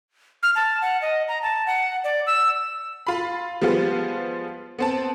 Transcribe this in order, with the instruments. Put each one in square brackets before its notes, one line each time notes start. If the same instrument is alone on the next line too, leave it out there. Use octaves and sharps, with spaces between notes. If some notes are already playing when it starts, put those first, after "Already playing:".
[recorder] F6
A5
F#5
D#5
A#5
A5
F#5
D5
E6
[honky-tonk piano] F4 B5
F3 G3 G#3 B3 F4
B3 C4 A5